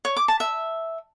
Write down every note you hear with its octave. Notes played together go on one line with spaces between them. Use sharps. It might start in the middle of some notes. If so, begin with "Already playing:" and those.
C#5
D6
A5
E5